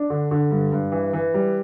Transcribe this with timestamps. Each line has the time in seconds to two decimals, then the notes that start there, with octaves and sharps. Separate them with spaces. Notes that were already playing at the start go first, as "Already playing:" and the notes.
Already playing: D4
0.10 D3
0.31 D3
0.51 G2
0.72 G2
0.92 E3
1.13 E3
1.34 G3